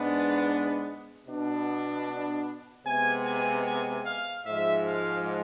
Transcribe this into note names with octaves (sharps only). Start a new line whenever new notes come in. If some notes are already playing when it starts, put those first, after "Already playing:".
Already playing: G#2 G#3 B3 D4
B2 B3 D4
C3 G#3 B3 G#5
G#5
G#5
F5
G#2 F3 G#3 E5
F5